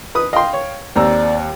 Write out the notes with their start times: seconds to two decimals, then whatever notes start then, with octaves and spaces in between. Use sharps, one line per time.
0.15 B4 D#6
0.33 D#5 F5 G5 C6
0.53 C#5
0.96 D#2 C4 D5 A#5 E6